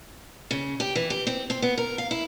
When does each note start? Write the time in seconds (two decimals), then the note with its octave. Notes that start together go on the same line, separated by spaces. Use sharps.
0.51 C#3
0.80 G4
0.95 E3
1.10 G4
1.27 C4
1.50 C4
1.62 B3
1.78 A#4
1.98 F5
2.11 E4